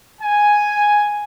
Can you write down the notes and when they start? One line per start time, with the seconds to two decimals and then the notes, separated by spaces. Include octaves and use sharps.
0.21 G#5